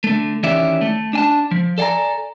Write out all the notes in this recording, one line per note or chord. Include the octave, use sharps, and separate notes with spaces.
D3 A3
D#3 E3 C#4 G4 D5 E5
A3
D4 G#5 A5
F3
A4 D5 F5 G#5 A#5